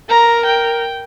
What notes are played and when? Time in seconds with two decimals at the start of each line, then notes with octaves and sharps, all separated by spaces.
0.09 A#4 A#5
0.46 G5